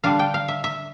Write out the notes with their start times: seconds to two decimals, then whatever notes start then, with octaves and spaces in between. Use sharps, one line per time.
0.04 D3 G3 D4 F5
0.19 G5
0.34 F5
0.48 E5
0.64 E5